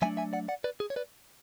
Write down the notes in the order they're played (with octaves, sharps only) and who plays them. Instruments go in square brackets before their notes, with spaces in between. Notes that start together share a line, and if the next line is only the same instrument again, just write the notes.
[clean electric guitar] F#3 A3 D4 E5 G#5
E5 G#5
D5 F#5
D5 F#5
B4 D5
G#4
C#5
B4 D5